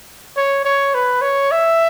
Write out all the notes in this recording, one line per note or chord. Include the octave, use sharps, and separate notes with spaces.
C#5
C#5
B4
C#5
E5